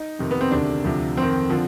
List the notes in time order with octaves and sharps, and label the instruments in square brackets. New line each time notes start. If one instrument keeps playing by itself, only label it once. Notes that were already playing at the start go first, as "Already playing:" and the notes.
Already playing: [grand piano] D#4
F2 C3 D#3
B3
C4
D2 C3 D#3 D4
D2 C3 F3
F2 D#3 C4
D3 F3